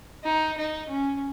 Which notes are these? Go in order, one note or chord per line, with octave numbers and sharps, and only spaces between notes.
D#4
D#4
C#4